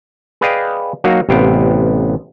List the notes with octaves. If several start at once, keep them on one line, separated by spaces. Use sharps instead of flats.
G#4 B4 D5 D#5 F5 G5
F#3 A#3 D#4 F#4 F5
A1 C3 B3 F5 G5